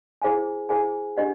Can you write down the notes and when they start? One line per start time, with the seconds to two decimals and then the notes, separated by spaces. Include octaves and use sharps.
0.22 E4 G#4 C5 F5 G#5
0.69 E4 G#4 C5 F5 G#5
1.17 D4 G4 C5 D#5 F#5